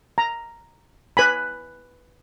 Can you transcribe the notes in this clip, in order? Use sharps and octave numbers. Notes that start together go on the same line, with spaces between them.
A#5
B4 G#5 B5